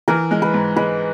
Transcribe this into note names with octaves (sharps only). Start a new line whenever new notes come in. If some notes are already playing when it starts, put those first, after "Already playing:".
E3 A#4
G#3
B4
G#2
G#3 B4